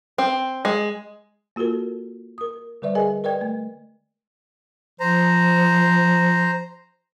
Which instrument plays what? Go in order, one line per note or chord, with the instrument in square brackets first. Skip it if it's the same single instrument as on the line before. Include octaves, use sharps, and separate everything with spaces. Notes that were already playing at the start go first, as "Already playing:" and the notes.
[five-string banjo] C4
G#3
[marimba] A#3 F4 F#4 A4 A#4
A#4 D#6
D3 G3 B4 D5 E5
G#4 A#4 D#5 G#5
A#4 B4 D5 D#5 G5 G#6
A3
[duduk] F3 [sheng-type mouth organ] C5 A#5